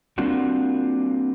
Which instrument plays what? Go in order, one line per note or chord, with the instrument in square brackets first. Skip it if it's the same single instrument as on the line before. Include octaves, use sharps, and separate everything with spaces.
[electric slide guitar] G3 A#3 C4 D4 F4 F#4